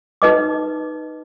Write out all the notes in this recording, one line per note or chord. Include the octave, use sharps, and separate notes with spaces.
D#4 B4 D#5 D6